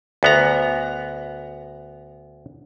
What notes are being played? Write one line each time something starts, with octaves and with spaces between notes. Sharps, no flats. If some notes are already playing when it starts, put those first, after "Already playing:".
D2 B3 A#5